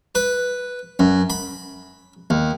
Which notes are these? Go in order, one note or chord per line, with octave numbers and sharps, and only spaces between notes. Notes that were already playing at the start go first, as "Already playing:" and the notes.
B4
F#2
B5
D#2